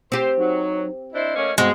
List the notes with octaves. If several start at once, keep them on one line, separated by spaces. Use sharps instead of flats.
C4 G4 C5
F#3 D#4
D4 E4 C5 D#5
A3 A#3 C#4
G2 G#3 B3 C4 F#4